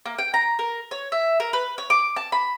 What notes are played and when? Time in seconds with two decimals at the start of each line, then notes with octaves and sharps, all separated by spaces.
0.06 A#3
0.18 G5
0.34 A#5
0.59 A#4
0.91 C#5
1.12 E5
1.40 A#4
1.53 B4
1.78 C#5
1.90 D6
2.16 A5
2.32 B5